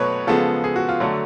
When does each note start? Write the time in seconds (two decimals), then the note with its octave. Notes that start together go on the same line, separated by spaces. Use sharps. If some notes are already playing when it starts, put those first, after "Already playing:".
Already playing: B2 F#3 A3 B4 C#5
0.27 C#3 F3 G#3 B3 A4
0.64 G#4
0.76 F#4
0.89 F4
1.00 D3 F#3 A3